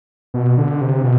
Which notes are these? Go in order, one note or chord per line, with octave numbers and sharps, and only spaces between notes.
B2
D3
C3
B2